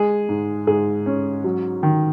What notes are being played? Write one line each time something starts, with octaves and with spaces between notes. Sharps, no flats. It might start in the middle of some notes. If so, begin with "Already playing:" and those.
Already playing: G#3 G#4
G#2
G#2 G#4
C#4
F#3
D#3